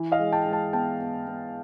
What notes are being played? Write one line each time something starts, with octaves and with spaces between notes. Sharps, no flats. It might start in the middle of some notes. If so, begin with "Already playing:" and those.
Already playing: E3
D#5 F5
G#3
G5 A5
G#3
G5 A5
B3 G5 A5
B3
B3